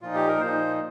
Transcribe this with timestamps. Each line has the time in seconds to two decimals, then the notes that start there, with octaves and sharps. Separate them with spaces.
0.02 A#2 F3 D#4 F4
0.15 G4
0.28 A#4
0.41 A#2 F3 D#4 C5